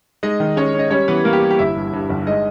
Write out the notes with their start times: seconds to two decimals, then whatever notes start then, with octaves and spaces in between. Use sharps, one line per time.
0.23 G#3 D#4 D#5
0.40 D#3
0.56 G#3 C#4 C#5
0.74 C#4
0.79 D#5
0.91 G3 C#4 C#5
1.08 E3 B3 B4
1.25 G3 A#3 A#4
1.33 G4
1.42 G3
1.51 G4
1.59 G1 E4 E5
1.76 G2
1.93 G2
2.10 G1
2.27 G#3 D#4 D#5